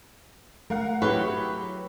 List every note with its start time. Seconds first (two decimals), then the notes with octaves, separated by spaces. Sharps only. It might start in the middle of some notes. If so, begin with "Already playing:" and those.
0.70 A3 A#4 F5 F#5
1.02 F#3 E4 G4 G#4 B4 C#5